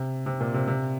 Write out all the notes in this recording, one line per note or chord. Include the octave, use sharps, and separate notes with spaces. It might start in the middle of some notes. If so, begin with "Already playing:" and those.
Already playing: C3
C3
A#2
C3
C3